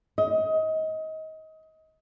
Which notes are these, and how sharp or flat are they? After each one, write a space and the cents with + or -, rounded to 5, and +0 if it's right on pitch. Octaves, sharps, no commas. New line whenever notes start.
D#5 +25